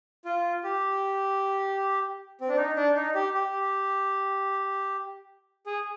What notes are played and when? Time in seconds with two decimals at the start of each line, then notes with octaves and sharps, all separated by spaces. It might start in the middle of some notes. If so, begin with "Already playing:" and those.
0.25 F4
0.64 G4
2.41 C4
2.49 D4
2.57 D#4
2.76 D4
2.96 D#4
3.15 G4
3.34 G4
5.66 G#4